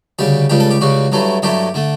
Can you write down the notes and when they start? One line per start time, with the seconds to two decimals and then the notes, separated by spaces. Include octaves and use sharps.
0.19 D2 C#3 G3 G4
0.50 C#2 C#3 G3 G4
0.60 A4
0.71 G4
0.81 C#2 C#3 G3 F#4
1.12 G2 F#3 A3 E4
1.43 G2 F#3 A3 E4 G4
1.74 D3 A3